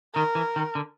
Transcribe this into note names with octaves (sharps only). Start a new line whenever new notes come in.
D#3 A#4
E3
D#3
D3